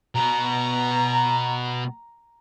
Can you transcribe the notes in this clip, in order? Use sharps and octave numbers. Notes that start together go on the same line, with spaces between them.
B2 B3 A#5